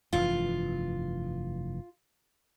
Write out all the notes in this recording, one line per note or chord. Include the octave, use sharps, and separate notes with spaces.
F1 G2 E3 F4